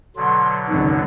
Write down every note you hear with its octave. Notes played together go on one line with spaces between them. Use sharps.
B2 D3 F#3 C6
G#1 C#2 F#2 D#4